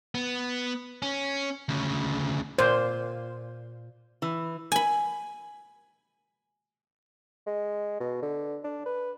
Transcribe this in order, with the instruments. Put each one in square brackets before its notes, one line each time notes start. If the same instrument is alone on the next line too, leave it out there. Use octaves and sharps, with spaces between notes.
[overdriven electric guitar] B3
C#4
D2 C#3
[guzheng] A#2 [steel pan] C5
[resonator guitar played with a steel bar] E3
[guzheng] G#5 B5
[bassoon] G#3
B2
D3
D4
B4